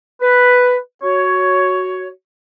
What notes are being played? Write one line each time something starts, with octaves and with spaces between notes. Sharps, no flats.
B4
F#4 C#5